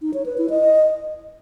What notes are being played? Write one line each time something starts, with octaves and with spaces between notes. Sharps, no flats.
D#4
C#5
B4
E4
D#5